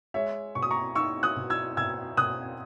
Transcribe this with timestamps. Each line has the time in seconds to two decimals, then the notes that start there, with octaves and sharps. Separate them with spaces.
0.14 G#3 C#5 E5
0.55 B2 C#6
0.63 D#6
0.71 A#5 C#6
0.95 D#4 C#6 E6
1.23 D#6 F#6
1.36 B2
1.50 E6 G#6
1.77 B2 E6 G#6
2.17 B2 D#6 F#6